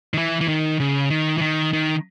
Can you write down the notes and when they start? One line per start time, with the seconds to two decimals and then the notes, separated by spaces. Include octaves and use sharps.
0.14 D#3
0.18 E3
0.41 E3
0.48 D#3
0.80 C#3
1.10 D#3
1.38 E3
1.41 D#3
1.73 D#3